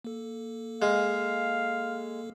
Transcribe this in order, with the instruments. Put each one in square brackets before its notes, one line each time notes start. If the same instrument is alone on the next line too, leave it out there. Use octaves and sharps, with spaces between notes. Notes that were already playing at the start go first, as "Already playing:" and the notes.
[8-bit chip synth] A#3 A4
[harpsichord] G#3 [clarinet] F5